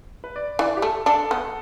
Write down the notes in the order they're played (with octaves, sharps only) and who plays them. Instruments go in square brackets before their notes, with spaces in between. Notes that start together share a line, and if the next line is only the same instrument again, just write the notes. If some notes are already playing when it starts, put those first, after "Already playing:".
[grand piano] B4
D5
[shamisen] E3 [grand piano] D5
[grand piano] G4
[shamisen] A3 [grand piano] A4
[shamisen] D4 [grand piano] A4
[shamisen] B3